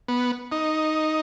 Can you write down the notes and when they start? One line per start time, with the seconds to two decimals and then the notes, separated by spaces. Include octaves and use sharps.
0.08 B3
0.52 D#4